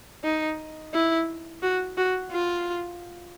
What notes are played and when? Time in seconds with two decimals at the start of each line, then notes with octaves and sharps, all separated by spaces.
0.24 D#4
0.94 E4
1.62 F#4
1.97 F#4
2.32 F4